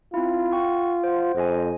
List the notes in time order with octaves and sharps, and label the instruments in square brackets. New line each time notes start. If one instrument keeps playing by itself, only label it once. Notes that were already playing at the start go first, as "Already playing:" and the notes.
[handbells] C4 E4 [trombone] F4
[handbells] F#5 G5 C#6
C5 F#5
[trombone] F2 [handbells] C5 D#5 G#5